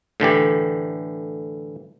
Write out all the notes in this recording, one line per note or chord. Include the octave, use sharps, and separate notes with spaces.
A2 D3 E3 G4